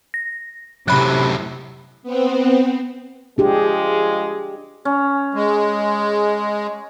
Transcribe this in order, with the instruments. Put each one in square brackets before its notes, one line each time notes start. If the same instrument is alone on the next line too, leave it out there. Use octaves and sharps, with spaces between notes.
[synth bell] A#6
[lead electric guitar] F#2 A2 [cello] C3 [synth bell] B5 F#6
[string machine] B3 C4
[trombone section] F3 G#3 [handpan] D4 G4 G#4
[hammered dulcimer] C#4
[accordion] G#3